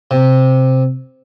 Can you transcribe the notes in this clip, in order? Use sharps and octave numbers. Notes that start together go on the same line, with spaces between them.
C3